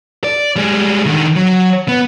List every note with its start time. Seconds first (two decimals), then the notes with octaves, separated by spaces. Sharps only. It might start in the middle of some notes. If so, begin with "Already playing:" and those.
0.24 D5
0.56 G3 G#3
1.06 D3 D#3
1.36 F#3
1.88 B3